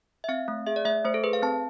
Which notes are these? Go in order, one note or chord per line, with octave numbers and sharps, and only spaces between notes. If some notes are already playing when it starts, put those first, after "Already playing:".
E5
C4 F5
A3
G#4 E5
D5
A3 E5
A3 C5
A4
G#4 B4
F5
C4 A5